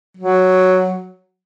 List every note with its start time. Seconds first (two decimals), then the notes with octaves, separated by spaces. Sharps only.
0.17 F#3